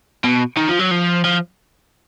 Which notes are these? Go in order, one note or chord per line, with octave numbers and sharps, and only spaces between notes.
B2
D#3
F3
F#3
F3
F3